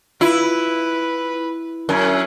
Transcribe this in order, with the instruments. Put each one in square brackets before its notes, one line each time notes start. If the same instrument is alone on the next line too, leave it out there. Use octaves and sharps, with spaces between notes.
[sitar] E4 [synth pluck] F4 [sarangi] B4
[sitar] F#2 [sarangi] C#4 [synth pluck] A#4 G#5